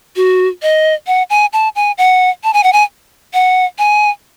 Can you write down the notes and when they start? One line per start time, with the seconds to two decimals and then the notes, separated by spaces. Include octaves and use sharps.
0.16 F#4
0.62 D#5
1.07 F#5
1.30 G#5
1.53 A5
1.76 G#5
1.98 F#5
2.44 A5
2.53 G#5
2.63 F#5
2.73 G#5
3.34 F#5
3.78 G#5